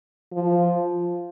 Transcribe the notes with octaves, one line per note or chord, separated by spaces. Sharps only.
F3